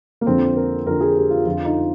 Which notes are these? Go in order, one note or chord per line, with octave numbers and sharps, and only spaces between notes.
A#3
F2 D3 F3 C4
A#4
F2 D3 F3 A#4
G#4
G4
F4
F2 D3 F3 F4
D#4